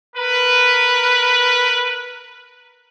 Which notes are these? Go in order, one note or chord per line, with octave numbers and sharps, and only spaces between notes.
A#4 B4